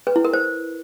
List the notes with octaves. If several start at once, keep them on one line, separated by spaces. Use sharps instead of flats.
B4
E4
A#4
C5